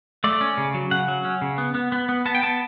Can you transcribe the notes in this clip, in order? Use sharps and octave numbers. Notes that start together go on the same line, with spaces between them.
A3 D5
C#4
C#3
F#3
C#3 F#5
F#3
C#4
C#3
B3
B3
B3
B3
B3 A5
G5
B3 A5